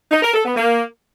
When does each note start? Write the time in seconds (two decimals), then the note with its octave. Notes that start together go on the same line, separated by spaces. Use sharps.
0.12 D#4
0.23 A#4
0.34 A4
0.45 B3
0.57 A#3